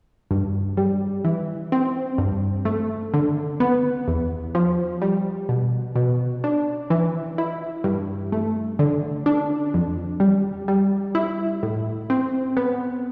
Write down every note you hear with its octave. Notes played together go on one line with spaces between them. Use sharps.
G2
G3
E3
C4
G2
A3
D3
B3
E2
F3
G3
B2
B2
D4
E3
E4
G2
A3
D3
D4
F2
G3
G3
E4
A2
C4
B3